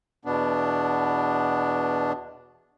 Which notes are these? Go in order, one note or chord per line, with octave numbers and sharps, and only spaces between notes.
E2 B2 B3 D4